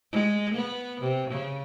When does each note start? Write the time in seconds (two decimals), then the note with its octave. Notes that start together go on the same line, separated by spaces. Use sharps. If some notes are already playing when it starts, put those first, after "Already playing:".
0.12 G#3
0.55 B3
1.01 C3
1.30 C#3